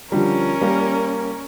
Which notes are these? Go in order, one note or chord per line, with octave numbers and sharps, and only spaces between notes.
D3 F3 G3 C#4 A#4
G3 A#3